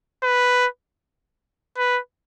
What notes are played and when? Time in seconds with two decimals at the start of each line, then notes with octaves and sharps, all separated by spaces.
0.23 B4
1.77 B4